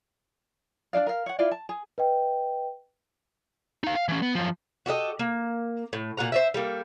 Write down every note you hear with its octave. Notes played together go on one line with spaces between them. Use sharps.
D4 D#4 D5 F5
A#4 F5
C#5 F#5
E4 F4 D5 F5
A5
G#4
B4 D#5 G5
D#4 F5
F5
E3 C#4
B3
F#2 F3
F#4 G4 A4 D#5
A#3
A2
A#2 F#4 F#5 A#5
C5 D#5 E5
G3 A3 A#3